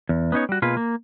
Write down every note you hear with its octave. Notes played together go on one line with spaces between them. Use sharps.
E2
B3 C#4 D#4 C#5
G3 F#4
B2 A#3 F4 G#4 B4
A#3